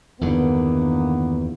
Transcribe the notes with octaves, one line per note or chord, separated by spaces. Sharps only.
E2 G2 D3 D#3 A#3 B3